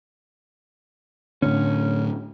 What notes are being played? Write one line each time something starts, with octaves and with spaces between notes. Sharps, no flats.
A2 D3 C#4